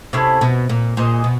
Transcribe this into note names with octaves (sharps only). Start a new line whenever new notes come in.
C3 A3 C#4 E4 G#4
B2
A#2
A#2 G#4 C5 D#5
B2